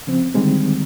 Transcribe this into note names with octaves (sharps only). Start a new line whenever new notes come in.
C#3 F3 C4
D3 D#3 G3 G#3 C4